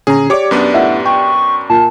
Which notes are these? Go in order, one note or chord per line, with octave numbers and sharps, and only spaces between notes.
A#2 D3 C#4 G#4 A#5
G4 C#5 D5 D6
F#2 B3 D4
A2 E5 F#5
G5 C#6
A#2 A5